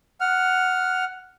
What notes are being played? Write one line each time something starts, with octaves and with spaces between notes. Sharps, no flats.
F#5 F6